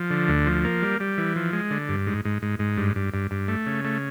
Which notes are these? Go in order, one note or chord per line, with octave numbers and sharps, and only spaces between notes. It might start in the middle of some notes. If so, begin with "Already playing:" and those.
Already playing: F3
D3
D2
F3
A#3
G3
G3
E3
F3
G#3
D3
G2
G#2
G#2
G#2
G#2
G2
G2
G2
G2
A3
C#3
A3